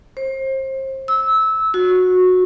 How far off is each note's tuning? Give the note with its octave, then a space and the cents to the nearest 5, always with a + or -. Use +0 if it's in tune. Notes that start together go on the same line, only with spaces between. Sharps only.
C5 +30
E6 -20
F#4 -15